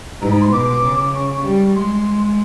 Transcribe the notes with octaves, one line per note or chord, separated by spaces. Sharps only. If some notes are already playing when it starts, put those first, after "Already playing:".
G#2 A#5
B5
C6
B2 D6
C#3
C#6
C#6
G3
G#3 C6